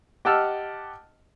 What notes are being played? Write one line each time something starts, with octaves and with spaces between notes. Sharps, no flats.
G4 D#5 F#5 A5 E6 F6